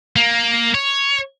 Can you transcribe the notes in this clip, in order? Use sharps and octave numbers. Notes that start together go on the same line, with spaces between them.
A#3
C#5